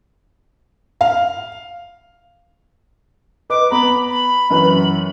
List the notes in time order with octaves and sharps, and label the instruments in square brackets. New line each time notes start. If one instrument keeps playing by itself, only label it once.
[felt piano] F5
[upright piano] B4 D#5 [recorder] D6
[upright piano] B3 A#5 [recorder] B5
[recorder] B5
[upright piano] F#2 E3 B4